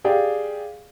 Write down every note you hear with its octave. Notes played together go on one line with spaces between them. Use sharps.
G4 G#4 D5 F5 G5